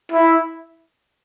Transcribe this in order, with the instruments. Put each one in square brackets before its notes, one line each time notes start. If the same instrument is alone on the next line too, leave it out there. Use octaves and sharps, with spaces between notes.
[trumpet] E4